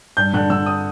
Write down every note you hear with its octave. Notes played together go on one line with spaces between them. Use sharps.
G2 G6
D3 F#6
D3 E6
D#6